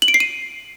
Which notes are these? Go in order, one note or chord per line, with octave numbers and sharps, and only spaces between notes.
F#7
D7
C7
D#7